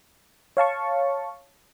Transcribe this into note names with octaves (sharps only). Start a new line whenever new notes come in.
C#5 F5 A5 C#6